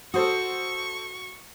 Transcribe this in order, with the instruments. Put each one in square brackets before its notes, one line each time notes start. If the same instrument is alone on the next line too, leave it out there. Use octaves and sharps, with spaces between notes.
[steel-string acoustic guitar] F#4 [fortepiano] A4 C5 D#6 [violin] C#6